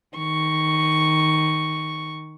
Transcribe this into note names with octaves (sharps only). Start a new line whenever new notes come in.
D#3 C#6